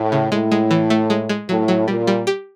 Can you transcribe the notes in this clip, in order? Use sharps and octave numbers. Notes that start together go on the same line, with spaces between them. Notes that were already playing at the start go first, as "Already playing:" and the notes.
Already playing: A2
C#3
A2 G#3
G#3
E3
A3
G#3
G#3
A2 F#3
F#3
A#2 G3
G3
G4